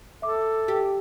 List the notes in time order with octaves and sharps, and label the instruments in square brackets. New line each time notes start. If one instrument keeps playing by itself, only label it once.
[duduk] A4 [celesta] E5 D6
[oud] G4